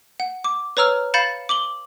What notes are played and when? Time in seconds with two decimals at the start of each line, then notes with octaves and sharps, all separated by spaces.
0.20 F#5
0.44 D6
0.77 B4 C#5 A#5 E6 F6
1.14 F5 B5 G6 A6 C#7 E7
1.49 D6 F#7 G7